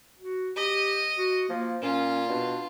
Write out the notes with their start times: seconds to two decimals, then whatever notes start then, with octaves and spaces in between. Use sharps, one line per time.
0.19 F#4
0.56 G4 D#5
1.18 F#4
1.49 F3 A#3
1.82 A#2 C#4 F4
2.29 B2 D4